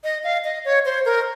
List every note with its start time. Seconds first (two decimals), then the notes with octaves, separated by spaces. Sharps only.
0.04 D#5
0.24 F5
0.44 D#5
0.65 C#5
0.85 C5
1.05 A#4